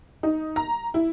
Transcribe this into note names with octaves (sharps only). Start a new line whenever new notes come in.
D#4
A#5
E4